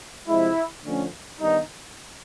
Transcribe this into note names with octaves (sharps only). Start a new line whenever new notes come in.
C3 F3 G#3 E4
D3 F3 A3 C#4
G2 D#3 G3 B3 D#4